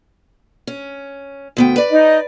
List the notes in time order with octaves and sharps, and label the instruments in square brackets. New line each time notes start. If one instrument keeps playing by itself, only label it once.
[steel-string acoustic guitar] C#4
D2 B3 G5
B4 D5
[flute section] D#4 D#5